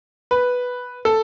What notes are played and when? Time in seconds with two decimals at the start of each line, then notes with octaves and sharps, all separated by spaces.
0.31 B4
1.05 A4